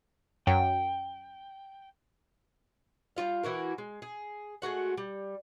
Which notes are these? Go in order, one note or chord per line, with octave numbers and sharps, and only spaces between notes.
F#2 G5
G3 C#4 F4 F5
E3 E4 F#4 A#4
G#3
G#4
G#3 A3 F#4 F#5
G3